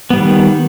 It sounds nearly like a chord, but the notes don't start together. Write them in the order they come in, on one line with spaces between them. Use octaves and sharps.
B3 G3 D#3